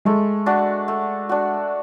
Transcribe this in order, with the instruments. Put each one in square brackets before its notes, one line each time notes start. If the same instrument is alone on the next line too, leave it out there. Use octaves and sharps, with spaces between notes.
[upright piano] G#3 [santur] A3
[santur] D4 F#4
A3
D4 F#4